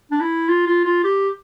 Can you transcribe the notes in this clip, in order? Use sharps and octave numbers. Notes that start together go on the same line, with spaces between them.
D4
E4
F4
F4
F4
G4